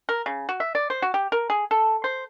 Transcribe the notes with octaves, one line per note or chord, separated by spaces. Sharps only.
A#4
C#3
F#4
E5
D5
C5
F#4
G4
A#4
G#4
A4
C5